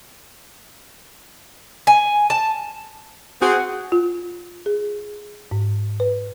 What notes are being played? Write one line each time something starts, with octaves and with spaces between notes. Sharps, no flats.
G#5
A5
C4 F#4 G#4 F#5
F4
G#4
G#2
B4